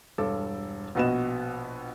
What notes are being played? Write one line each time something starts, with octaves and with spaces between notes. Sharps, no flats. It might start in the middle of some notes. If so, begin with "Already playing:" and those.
E1 G2 A4 D6 E6
A#1 B2 B3 D#5 E7